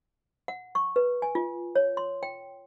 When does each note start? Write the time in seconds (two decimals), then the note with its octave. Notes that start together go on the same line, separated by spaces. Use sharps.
0.48 F#5
0.75 C#6
0.96 B4
1.22 G#5
1.35 F4
1.75 C#5
1.97 C6
2.23 G5